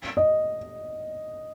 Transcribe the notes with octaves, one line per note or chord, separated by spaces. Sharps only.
D#5